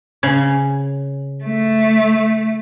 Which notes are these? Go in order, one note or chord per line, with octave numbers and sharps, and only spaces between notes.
C#3
A3